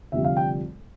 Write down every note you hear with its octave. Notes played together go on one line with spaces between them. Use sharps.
F1 F2 D3 G3 E5
F5
G5